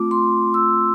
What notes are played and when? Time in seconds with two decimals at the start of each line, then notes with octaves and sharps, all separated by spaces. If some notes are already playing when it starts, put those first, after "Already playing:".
Already playing: A3 C4 F4 D6
0.11 C6
0.54 E6